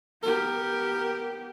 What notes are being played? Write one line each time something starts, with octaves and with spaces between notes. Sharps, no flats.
B3 G4 A#4